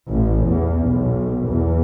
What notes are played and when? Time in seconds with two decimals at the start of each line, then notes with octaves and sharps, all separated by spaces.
0.10 A1
0.48 E2
0.88 B1
1.47 E2